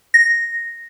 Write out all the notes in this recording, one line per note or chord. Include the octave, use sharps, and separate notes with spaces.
A#6